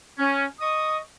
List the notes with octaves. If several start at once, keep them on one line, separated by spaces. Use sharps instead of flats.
C#4
D#5 C#6 D#6